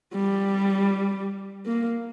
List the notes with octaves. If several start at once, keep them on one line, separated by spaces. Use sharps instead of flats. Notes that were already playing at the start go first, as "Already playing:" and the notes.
G3
A#3